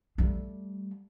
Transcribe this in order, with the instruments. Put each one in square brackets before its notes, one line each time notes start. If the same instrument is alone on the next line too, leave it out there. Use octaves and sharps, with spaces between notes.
[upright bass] G3 A3